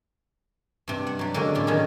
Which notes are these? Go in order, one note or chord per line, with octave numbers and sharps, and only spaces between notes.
G2 C3
F#5
F#3 G3
D3 G#3 A#3 C#4
A2 C3
D#3 F#3 C#4 F#4 G#4